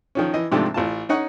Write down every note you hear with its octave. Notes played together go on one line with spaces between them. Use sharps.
D#3 F3 C#4
E3 D#5
G#2 C3 D#3 F3 A3 D4
A1 F4 A5
C#4 D#4 F#5 C#6